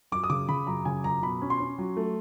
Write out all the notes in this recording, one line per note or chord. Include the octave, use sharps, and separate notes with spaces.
F#2 D6
D#6
C#3 D6
C#3 B5
F#2 A#5
C#3 G#5
F#2 A#5
B2 B5
C#4
C6
C#4
F#3
A3